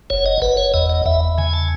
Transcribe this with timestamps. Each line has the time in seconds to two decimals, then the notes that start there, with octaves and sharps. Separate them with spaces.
0.10 F#1 C#5
0.26 D#5
0.42 F#1 B4
0.57 C#5
0.74 E2 D#5
0.90 D#5
1.06 E2 E5
1.38 C#3 G#5
1.54 A5